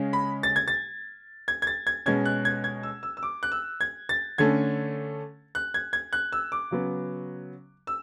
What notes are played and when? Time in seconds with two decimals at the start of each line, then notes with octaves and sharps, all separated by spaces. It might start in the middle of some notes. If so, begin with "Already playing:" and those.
Already playing: C#3 G#3 C#4
0.13 B5
0.43 A6
0.56 G#6
0.68 A6
1.48 G#6
1.62 G#6
1.67 A6
1.87 G#6
2.06 B2 G#3 C#4 G#6
2.25 F#6
2.45 G#6
2.64 G#6
2.83 E6
3.03 E6
3.17 E6
3.23 D6
3.43 F#6
3.52 E6
3.81 G#6
4.09 A6
4.38 D3 A3 C#4 G#6
5.55 F#6
5.74 G#6
5.93 G#6
6.13 F#6
6.32 E6
6.52 D6
6.71 C#3 F#3 B3
7.87 E6